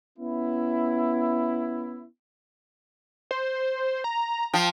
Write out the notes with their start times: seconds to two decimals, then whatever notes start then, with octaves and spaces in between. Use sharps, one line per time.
0.18 B3 C#4 E4
3.31 C5
4.04 A#5
4.54 F3 G5